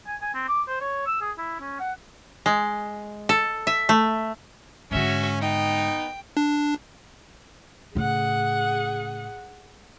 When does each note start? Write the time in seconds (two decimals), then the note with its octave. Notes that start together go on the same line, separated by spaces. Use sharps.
0.07 G#5
0.22 G#5
0.35 C4
0.48 D6
0.68 C5
0.81 C#5
1.06 E6
1.21 G#4
1.38 E4
1.60 C#4
1.80 F#5
2.46 G#3
3.29 A4
3.67 E5
3.89 A3
4.91 G#2 D3 C#4 F#4 E5
5.41 B3 D#4 G5
6.37 D4
7.95 A2 C#3 G#4 F#5